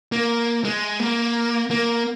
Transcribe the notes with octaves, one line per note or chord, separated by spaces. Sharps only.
A#3
G#3
A#3
A#3